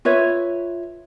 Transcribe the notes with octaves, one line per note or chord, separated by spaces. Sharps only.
F4 B4 C#5 E5